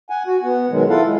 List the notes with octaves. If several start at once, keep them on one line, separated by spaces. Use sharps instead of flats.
F#5 G#5
F#4
B3 F#5
B2 D#3 F#3 G#3
E4 F4 A4 F5 F#5
G#3